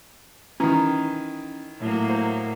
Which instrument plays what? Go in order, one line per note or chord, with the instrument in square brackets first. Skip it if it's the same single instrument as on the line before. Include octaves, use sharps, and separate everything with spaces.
[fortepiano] D#3 E3 [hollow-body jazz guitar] C#4 A#5
[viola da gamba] A2 F#3 A#3
[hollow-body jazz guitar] C5